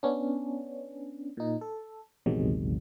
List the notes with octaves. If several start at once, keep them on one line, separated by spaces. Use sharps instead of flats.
B3 C#4 D4
A#2 D#4
A4
A#1 E2 C3 D#3 F#3 G#3